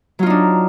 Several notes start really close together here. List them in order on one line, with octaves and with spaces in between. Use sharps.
F#3 F4 D#4 D4